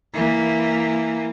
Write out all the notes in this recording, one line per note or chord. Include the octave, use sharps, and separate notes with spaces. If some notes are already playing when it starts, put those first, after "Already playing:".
E3 A#3